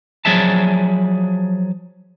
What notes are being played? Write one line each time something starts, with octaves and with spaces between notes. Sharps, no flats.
F3 F#3 G#4 D5 E5 A5